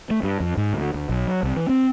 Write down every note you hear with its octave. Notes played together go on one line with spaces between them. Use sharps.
A3
G2
F2
G#2
D2
D2
B1
F#3
C2
E3
C4